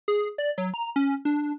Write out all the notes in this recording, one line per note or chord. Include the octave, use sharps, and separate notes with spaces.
G#4
D5
F#3
A#5
C#4
D4